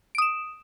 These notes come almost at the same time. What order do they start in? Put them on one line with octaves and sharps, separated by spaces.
D7 D#6 E7